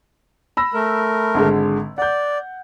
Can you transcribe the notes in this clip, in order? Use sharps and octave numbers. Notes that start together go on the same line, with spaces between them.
B5 E6 A#6
A3 A#4
G#1 D3 G#3
D5 F#5 G6